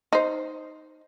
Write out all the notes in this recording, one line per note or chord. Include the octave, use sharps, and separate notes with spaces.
D#4 C5